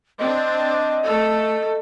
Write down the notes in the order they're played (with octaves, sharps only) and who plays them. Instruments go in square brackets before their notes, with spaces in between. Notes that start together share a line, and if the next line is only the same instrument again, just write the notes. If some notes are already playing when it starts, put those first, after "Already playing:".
[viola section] C4 D4 [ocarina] D#5
[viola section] A3 A4